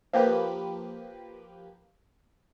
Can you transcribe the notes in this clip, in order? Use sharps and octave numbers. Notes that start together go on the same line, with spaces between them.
F3 A#3 G4 B4